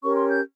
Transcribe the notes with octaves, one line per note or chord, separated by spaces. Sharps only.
C#4 G4 A#4 C#5 C#6
C6
G6